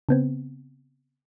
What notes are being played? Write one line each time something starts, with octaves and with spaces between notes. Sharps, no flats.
C#3 B3 C4